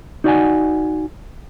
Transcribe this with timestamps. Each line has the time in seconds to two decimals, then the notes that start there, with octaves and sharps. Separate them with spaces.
0.24 D#4 F#4 D5 F5 F#5 G#5